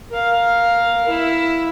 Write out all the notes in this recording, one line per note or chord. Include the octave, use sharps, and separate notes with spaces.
A#4 F5
E4 E5